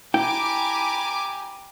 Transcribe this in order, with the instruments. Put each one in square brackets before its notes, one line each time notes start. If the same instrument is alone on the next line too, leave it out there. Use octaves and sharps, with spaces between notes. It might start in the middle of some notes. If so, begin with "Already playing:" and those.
[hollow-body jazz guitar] E4 G5 [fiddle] G4 [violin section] G#5 D6 [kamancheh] A#5 B5